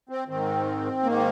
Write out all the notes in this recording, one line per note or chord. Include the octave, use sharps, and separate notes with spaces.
C4
G#2 D#3 C4
G#2 D#3 A#3